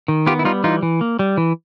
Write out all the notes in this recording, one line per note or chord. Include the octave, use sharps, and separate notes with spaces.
D#3
B3 F4 G4
E4
G3 D#4 F4
E3 D#4 F4
E3
A#3
G3
E3